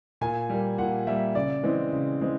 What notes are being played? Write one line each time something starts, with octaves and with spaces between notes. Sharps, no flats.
A#2 G#5
G3 A#3
A#2 F#5
G3 A#3 E5
C#3 D5
E3 G#3 C4
C#3
E3 G#3 C4